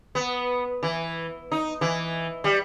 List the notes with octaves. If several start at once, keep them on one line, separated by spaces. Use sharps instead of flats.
B3
E3
D#4
E3
G3